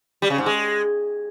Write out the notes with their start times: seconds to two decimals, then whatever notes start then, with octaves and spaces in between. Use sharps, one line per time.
0.22 G3
0.30 C#3
0.38 G#2
0.46 G#3